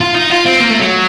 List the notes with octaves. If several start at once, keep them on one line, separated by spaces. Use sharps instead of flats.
F4
D#4
F4
C4
A#3
A3
F#3